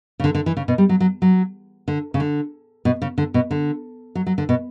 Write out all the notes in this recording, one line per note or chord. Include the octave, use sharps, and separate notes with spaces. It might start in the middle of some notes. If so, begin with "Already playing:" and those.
C#3
D3
D3
E3
C#3
B2
G3
F#3
F#3
F#3
D3
C#3
D3
B2
C#3
D3
B2
D3
F#3
F#3
D3
B2